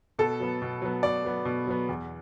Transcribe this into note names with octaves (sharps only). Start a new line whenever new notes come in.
B2 A4
F#3 B3
B2
F#3 B3
B2 D5
F#3 B3
B2
F#3 B3
E2